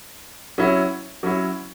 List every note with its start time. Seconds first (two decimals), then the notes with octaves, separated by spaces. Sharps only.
0.58 F#3 C#4 E4
1.23 F#3 C#4 E4